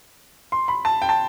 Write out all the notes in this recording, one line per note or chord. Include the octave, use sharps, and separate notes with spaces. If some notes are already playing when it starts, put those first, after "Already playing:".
C6
B5
A5
G5
A5